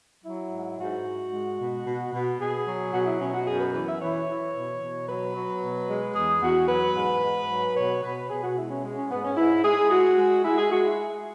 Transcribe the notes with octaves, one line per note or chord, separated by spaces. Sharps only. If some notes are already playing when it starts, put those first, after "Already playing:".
F#3 E4
G#2
G#2 F#4
G#2
G#3
B2
B2
B2
B2 G#4
F#3
B2 F#4
E4
B2 C#4
F#4
F#2 G#4
B4
E3 B4
E5
E3 C#5
E3
B2
B2
F#3 B4
F#3
B2
G#3
E2 G#4
E2 F#4
F#3 B4
G#2
G#2
F#3
B2 C#5
B2 B4
B2 G#4
F#4
G#3 E4
C#4
G#3
C#4
G#2 B3
C#4
G#2 E4
G#3 G#4
G#3 F#4
G#3
G#3 E4
G#4
G#3 F#4
E4